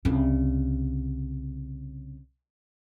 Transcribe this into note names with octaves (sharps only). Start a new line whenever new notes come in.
C2 C#3